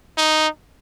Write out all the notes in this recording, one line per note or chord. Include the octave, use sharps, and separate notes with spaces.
D#4